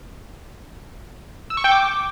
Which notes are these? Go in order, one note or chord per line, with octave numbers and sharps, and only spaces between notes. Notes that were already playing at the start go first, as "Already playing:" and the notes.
E6
C#6
G5
D6